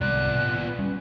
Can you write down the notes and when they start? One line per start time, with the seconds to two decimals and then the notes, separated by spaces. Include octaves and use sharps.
0.01 C2 G#2 B3 D5 F#6
0.35 A#2
0.49 A#2
0.66 B4
0.79 G3 C#4